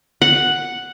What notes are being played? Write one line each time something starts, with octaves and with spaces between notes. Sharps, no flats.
F#5